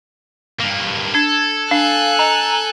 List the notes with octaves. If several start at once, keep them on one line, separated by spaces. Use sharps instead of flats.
G2 A#3
D4 A4 G#6
D4 F5 G#5 F#6
D#5 A#5